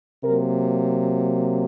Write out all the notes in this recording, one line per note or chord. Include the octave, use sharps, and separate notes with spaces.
C3 F#3 A#3 A#4